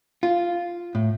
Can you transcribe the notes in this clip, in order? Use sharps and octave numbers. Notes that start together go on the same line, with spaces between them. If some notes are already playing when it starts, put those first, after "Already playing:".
F4
A2